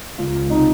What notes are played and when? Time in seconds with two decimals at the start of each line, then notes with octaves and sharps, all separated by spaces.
0.18 C#2 F4
0.34 C#2
0.50 C3 D#4